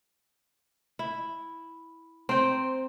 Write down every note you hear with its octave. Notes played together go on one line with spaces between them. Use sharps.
E4
C4 C5 G5 A#5